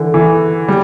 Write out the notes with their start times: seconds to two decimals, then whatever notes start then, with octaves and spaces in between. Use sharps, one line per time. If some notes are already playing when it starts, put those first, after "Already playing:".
Already playing: D3 E3
0.14 E3
0.68 G3